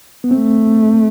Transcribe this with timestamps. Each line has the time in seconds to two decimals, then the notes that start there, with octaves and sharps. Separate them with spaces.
0.24 B3
0.31 A3 C4